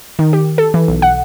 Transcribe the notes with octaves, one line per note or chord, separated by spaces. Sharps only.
D#3
G4
A4
E3
B1
F#5